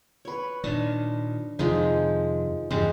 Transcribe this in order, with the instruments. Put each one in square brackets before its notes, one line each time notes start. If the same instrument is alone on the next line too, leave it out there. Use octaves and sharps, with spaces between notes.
[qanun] B4 C#5
[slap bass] A#2 D#3 [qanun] D4
[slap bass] F2 C3 D#3 [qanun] F3 G#3 D#4
[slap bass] E2 G2 C#3 [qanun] G#3 G4